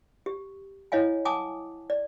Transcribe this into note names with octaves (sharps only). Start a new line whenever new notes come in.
G4
E4 C#5 D#5 F5 G#5
F#5 G#5 A5 D6 D#6
D5